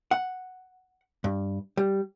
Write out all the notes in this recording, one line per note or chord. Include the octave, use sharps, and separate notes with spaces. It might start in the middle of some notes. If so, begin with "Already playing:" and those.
F#5
G2
G3